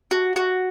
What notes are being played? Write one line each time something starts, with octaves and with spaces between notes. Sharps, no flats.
F#4
F#4